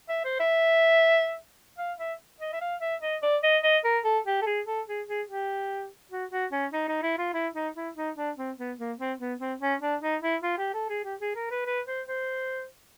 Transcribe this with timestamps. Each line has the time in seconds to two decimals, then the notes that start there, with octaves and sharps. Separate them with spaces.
0.09 E5
0.25 C5
0.40 E5
1.78 F5
1.99 E5
2.40 D#5
2.53 E5
2.61 F5
2.81 E5
3.02 D#5
3.23 D5
3.43 D#5
3.63 D#5
3.84 A#4
4.04 A4
4.26 G4
4.42 A4
4.46 G#4
4.67 A4
4.88 G#4
5.08 G#4
5.29 G4
6.11 F#4
6.32 F#4
6.52 C#4
6.73 D#4
6.88 D#4
7.03 E4
7.18 F4
7.34 E4
7.54 D#4
7.75 E4
7.96 D#4
8.16 D4
8.37 C4
8.58 B3
8.78 A#3
8.99 C4
9.20 B3
9.40 C4
9.60 C#4
9.81 D4
10.02 D#4
10.22 E4
10.43 F4
10.58 G4
10.74 A4
10.89 G#4
11.04 G4
11.21 G#4
11.36 A#4
11.51 B4
11.66 B4
11.88 C5
12.07 C5